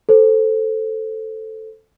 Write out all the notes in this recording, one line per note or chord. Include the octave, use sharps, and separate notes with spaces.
A4 C5